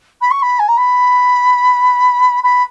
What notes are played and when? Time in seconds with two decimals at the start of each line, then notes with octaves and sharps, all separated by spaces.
0.21 B5
0.30 C#6
0.42 B5
0.59 G#5
0.68 A#5
0.77 B5
2.43 B5